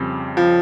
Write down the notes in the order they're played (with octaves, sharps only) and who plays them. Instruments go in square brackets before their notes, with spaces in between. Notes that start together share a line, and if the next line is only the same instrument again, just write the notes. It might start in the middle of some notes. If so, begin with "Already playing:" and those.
Already playing: [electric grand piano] F2 C#3 G3 C4
[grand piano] F3